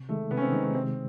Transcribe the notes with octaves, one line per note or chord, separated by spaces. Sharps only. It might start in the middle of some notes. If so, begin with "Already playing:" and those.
Already playing: C3
D#3 G#3 A3
C3 B3
C#4
C4
D#3 G#3 D#4
C#4
C3 C4